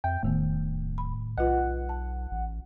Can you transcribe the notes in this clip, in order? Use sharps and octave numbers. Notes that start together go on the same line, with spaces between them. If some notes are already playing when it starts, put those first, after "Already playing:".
F2 E5 G5
D1 E2 A2 D#3 B3
B5
B1 F4 B4 D#5 F#5
A5
A1